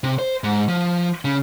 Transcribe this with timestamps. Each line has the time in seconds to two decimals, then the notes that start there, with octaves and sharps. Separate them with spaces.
0.04 C3
0.19 C5
0.44 G#2
0.68 F3
1.25 C#3